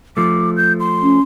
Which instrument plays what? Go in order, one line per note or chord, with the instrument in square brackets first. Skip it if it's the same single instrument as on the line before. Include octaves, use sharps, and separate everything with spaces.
[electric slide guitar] F3 A3 [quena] D6
[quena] G6
C6
[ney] C#4